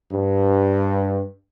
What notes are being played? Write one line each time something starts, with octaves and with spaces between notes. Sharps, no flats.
G2